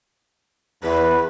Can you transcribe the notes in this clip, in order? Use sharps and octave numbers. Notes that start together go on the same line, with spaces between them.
E2 B4